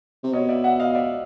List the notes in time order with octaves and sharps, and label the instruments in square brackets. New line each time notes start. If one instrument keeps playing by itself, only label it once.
[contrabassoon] C3
[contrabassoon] B2 [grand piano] C#5 D#5
[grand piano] D5 E5
E5 F#5
D#5 F5
D5 E5